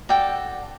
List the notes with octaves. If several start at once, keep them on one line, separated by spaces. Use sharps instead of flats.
F#4 A4 D5 G5